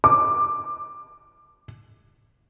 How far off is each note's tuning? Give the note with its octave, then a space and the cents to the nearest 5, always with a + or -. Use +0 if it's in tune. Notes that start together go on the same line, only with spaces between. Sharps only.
D6 +15